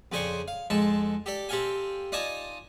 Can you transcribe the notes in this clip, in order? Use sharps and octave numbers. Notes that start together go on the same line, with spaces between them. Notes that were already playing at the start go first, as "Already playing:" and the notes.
F2 C#3 G#4 C5 D5 C#6
F5
F2 G#2 G#3 A4 A5
G4 A4 D5
C4 G4 A4 F5 G5 G#5
D#4 F4 D5 G#5 A5 D#6